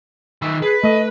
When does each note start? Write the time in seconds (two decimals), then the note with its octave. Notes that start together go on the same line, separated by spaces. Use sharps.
0.42 D#3 E5
0.62 G#4 B4
0.84 A3 D#5